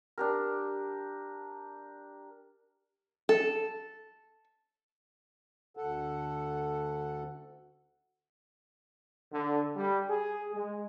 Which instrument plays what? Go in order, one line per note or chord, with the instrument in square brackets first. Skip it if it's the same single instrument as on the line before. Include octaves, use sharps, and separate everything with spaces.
[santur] D4 G4 A#4
[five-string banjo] A4
[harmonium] D2 A4 F#5
[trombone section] D3
G3
G#4
G#3